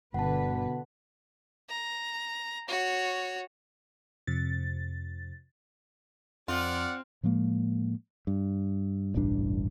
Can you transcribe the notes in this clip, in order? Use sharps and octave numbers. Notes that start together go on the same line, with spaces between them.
G1 B2 D3 B4 F#5 A5
A#5
F#4 C#5
F2 C3 A6
F2 C4 F4 D5 F#5
A2 F3 G#3 A#3
G2
E1 A1 G2 D4